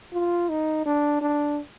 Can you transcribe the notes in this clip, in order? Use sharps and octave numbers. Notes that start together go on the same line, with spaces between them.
F4
D#4
D4
D4